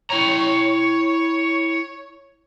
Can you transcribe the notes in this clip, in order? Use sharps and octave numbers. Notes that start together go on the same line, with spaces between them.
E4 C#5 G5 A#5